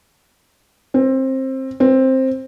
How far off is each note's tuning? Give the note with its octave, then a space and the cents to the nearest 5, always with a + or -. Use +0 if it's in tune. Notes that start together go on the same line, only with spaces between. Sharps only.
C4 +20
C4 +10